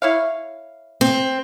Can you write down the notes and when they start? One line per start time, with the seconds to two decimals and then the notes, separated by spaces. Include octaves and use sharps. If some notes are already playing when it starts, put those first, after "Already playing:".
0.02 E4 C#5 F5
1.01 C4